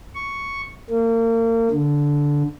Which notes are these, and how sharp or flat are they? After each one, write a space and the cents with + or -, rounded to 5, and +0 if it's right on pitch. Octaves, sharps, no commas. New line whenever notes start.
C#6 +0
A#3 -35
D3 -10